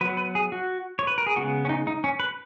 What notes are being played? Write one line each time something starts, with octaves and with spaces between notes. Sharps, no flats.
F#3 B3 B4
B4
G#4
F#4
C#5
B4
A#4
G#4
C#3 G#3 B3 F#4
C#4
D#4
D#4
C#4
B4